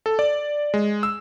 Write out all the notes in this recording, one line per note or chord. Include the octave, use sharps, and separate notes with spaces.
A4
D5
G#3
E6